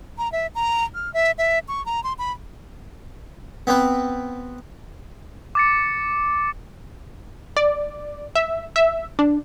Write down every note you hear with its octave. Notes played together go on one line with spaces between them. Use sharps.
A#5
E5
A#5
F6
E5
E5
C#6
A#5
C6
B5
B3 C4 B4
D6 A6 C#7
D5
E5
E5
D4